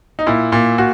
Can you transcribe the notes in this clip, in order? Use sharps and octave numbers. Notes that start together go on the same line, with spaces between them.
D#4
A#2 E4
A#2
A#2 F#4